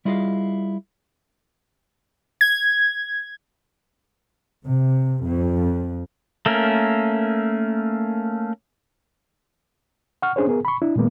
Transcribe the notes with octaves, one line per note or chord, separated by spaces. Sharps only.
G3 E4 F4 G#4 D#5 F5
G#6
C3
F2
A3 A#3 C#4 A#4
F#5 C#6 F6
C#4 D4 G#4 C5 C#5
B3 G#4 A#4
B5 C#6
D4 E4
A#2 D#3 G#3 A#3 B3